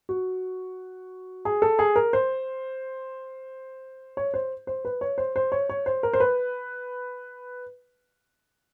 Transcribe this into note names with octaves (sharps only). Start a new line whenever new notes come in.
F#4
G#4
A4
G#4
A#4
C5
C#5
C5
C5
B4
C#5
C5
C5
C#5
C#5
C5
A#4
C5
B4